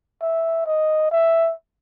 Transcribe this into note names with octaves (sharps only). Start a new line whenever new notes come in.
E5
D#5
E5